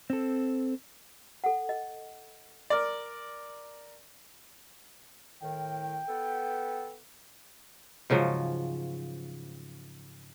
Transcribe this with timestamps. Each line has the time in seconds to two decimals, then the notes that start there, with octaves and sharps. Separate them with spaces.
0.10 C4 A4
1.44 A4 F#5
1.69 D#5
2.70 A#4 D5
5.43 A2 D#3 G5
6.09 B3 A4
8.10 G#2 C#3 F3 F#3